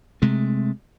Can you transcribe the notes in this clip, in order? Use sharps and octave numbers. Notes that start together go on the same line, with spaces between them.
C3 G#3 A3